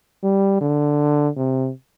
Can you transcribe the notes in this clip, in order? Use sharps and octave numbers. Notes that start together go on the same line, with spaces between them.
G3
D3
C3